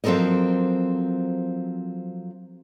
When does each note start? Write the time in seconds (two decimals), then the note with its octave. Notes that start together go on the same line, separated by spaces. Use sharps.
0.04 F3 F#3 C4 A4 A#4 D#5